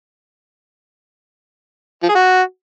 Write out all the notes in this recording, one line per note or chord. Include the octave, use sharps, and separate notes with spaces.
F3
G#4
F#4